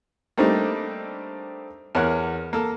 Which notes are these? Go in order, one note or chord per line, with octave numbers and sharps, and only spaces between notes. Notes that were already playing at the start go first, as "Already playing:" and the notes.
G3 A3 A#3 C4 D4 D#4
E2 A#4 C#5 F#5 F#6
A#3 A4